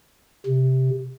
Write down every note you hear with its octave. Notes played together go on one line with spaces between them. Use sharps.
C3